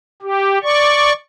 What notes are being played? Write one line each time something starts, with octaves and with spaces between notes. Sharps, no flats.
G4
D5 C#6